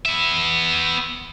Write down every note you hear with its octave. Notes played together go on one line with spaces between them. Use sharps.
B3 E5